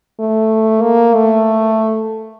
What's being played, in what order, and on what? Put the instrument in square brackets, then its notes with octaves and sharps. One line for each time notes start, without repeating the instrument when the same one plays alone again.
[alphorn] A3
A#3
A3